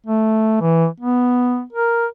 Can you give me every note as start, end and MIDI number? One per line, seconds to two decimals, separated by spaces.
0.06 0.58 57
0.61 0.87 52
1.00 1.63 59
1.73 2.06 70